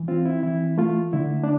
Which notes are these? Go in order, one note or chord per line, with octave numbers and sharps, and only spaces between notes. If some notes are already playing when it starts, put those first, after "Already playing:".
Already playing: E3
C4 F4
E4
E3 E4
A3 F4
D3 E4
D4